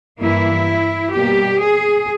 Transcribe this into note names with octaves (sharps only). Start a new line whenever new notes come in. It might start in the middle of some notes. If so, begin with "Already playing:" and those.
G2 E3 A#3 E4
B2 G3 A#3 G4
G#4